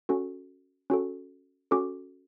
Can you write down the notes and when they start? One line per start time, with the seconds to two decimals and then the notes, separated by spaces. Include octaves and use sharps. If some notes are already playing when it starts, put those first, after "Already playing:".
0.09 C#4 F#4 A4
0.90 C#4 F#4 A4
1.71 C#4 F#4 A4 D6